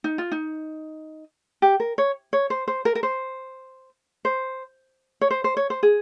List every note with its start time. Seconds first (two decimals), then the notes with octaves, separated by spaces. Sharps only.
0.04 D#4
0.18 F4
0.32 D#4
1.62 G4
1.80 A#4
1.98 C#5
2.33 C#5
2.50 C5
2.68 C5
2.85 A#4
2.95 A#4
3.03 C5
4.25 C5
5.21 C#5
5.31 C5
5.44 C5
5.57 C#5
5.70 C5
5.83 G#4